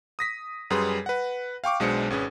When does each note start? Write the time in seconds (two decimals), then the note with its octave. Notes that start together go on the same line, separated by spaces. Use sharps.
0.19 D#6 A#6 B6
0.70 F#2 G3 G#4 B4 G#5 C6
1.06 B4 F#5
1.64 F5 G5 C#6 D6
1.80 B1 B2 G#3 D4 C5 C#7
2.10 G#1 C#4 G#4 B4